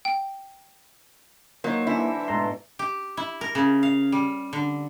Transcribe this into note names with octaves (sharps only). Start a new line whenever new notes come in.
G5
F#3 A#3 D#4 C5
D3 E3 F#3 E4
G#2 B2 A3 A4 A#5 C6
G4
E4
A#4
C#3
F5
G3
D3